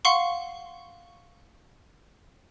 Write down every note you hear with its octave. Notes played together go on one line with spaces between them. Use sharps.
F5 F#5 C6 C#6